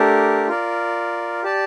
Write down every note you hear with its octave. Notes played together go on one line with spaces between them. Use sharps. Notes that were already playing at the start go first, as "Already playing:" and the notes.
Already playing: A3 D4 G4 A#4
F4 A#4 D5
G4 D5 A5